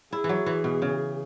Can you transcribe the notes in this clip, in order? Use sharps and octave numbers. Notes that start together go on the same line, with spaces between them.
E4 G#4
E3 F#3
E3
B2
C#3